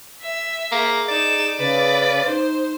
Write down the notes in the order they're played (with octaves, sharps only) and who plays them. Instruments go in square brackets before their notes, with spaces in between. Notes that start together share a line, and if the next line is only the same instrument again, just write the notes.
[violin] E5
[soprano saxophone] A#3 [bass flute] G#4
[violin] D#4 E7 [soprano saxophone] D5
[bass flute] C#3 [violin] B4
[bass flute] D#4 [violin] C5